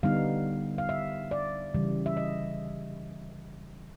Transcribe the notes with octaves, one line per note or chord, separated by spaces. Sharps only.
D3 G3 B3 D#4 F5
F5
E5
D5
C#3 E3 G3
E5
D#5